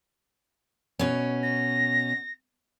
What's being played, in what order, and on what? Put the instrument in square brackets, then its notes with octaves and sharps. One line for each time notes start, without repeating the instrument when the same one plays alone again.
[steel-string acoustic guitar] B2 C#4
[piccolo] A#6